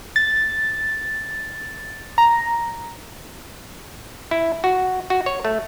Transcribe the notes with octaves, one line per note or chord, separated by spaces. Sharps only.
A6
A#5
E4
F#4
F#4
C#5
A3